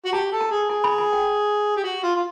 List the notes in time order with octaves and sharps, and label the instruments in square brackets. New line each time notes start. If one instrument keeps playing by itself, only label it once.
[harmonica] F#4
[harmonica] G4 [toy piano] A5
[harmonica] A4
[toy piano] A5
[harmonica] G#4
[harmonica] G#4 [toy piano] G#5
[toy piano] B5
G#5
G5
[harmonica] G4
F#4
F4
F4